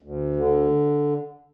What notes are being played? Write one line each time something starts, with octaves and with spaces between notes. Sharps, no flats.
D2
D3